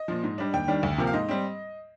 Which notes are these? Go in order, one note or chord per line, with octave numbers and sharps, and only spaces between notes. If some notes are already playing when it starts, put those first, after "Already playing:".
Already playing: D#5
A#2 F3
G#2
G3 D4
D#2 G5
D#3 G3 D4
D2
C3 F3 A#3
F5
G#2 D#5
G3 C4